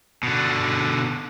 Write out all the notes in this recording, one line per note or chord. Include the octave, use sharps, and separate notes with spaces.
B2 D3